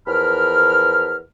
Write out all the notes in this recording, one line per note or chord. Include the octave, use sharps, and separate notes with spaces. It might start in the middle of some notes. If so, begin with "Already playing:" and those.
E2 F3 A#4 B5 F6